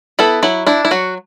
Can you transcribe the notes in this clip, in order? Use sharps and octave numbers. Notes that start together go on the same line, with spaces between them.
B3 E4 A4
F#3 E4
D4 E4
E4
F#3 F#4